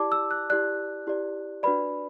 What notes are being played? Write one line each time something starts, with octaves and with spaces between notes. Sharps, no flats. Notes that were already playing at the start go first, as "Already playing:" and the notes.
Already playing: E4 G4 D5 A5 D6
E6
F#6
E4 G4 D5 F#6
E4 G4 D5
D4 F#4 B4 D5 B5